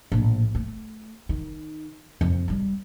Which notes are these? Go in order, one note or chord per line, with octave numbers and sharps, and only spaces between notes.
A#1 A2
A3
D#3 D#4
F2
G3 G#3